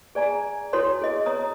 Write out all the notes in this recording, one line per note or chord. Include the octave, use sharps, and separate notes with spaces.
G#4 D5 G#5 A#5
E4 F#4 A4 C#5 C6
G#4 D#5
C#5 A#5 D#6